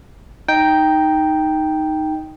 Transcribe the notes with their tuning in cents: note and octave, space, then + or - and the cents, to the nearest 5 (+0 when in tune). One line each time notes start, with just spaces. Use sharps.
D#4 +0 G5 +0